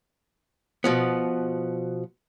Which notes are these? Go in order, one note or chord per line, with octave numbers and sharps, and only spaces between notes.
B2 F3 B3